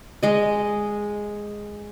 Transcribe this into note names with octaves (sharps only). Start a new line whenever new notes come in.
G#3 D#5